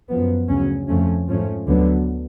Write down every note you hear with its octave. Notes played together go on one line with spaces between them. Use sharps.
F#2 F3 B3
D2 C#3 F#3 C#4
F2 F3 A3 C#4
G#2 F3 A3 C#4
D2 D3 F#3 B3